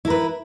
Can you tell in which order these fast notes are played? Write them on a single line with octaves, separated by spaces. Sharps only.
E4 A#4 B4